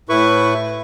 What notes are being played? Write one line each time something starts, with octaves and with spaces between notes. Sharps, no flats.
A2 E4 B4 C#6